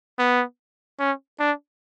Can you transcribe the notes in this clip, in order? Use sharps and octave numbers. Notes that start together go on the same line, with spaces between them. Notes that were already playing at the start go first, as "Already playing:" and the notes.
B3
C#4
D4